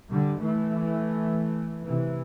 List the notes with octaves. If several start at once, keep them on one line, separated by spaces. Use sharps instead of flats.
D3 G3
E3 A3
C3 E3